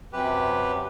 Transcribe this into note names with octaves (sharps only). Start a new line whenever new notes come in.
F#2 C3 G4 B4